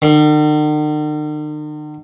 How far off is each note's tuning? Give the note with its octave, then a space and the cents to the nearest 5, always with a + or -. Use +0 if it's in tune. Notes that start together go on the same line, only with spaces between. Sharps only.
D#3 -45